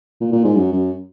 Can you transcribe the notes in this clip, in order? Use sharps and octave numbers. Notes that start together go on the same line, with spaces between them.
A#2
A#2
G#2
F#2
F#2